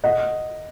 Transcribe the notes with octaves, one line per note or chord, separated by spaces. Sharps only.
D#5 F#5